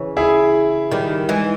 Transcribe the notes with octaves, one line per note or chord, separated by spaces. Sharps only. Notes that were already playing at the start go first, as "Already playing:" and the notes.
Already playing: C#3 E3
E4 G#4
D#3 G3
E3 G#3